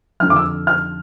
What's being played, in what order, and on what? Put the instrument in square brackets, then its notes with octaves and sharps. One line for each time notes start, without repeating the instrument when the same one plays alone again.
[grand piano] F2 D3 F3 F6
D6
E6
F6